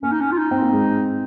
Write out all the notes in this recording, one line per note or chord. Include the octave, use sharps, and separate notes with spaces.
A#3 C#4
D#4
C#4
F4
D#4
C4
A#3
G#3